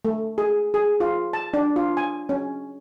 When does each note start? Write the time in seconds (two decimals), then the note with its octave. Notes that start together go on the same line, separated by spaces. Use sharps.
0.05 A3
0.38 G#4
0.74 G#4
1.00 F4
1.33 A5
1.54 D4
1.76 F4
1.97 G#5
2.29 C#4